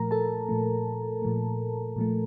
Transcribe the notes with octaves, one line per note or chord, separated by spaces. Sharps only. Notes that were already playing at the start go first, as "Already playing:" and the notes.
Already playing: A#2 F3 A3 A#4 A#5
A4 A5
A#2 F3 A3
A#2 F3 A3
A#2 F3 A3